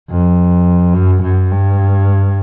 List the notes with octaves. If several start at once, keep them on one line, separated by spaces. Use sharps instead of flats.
F2
F#2
F#2
G2